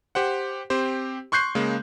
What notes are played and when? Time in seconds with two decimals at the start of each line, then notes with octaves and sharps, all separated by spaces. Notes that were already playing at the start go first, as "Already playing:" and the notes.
0.15 G4 C5 F#5
0.70 C4 G4 C5
1.32 C6 C#6 F#6 G6 C7
1.55 C#3 G#3 A#3